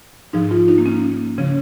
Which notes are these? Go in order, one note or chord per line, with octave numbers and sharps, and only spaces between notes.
G#2 F3 D#4
F4
D#4
A#3
C#4
A#3
C#3 F3 C#4